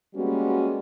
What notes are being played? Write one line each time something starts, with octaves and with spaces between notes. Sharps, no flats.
G3 G#3 A#3 B3 C#4 F#4